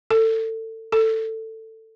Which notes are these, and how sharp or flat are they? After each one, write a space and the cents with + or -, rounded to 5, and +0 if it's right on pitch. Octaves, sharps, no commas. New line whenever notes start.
A4 +25
A4 +15